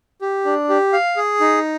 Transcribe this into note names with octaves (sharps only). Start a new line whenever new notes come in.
G4
D4
G4
F5
G#4
D#4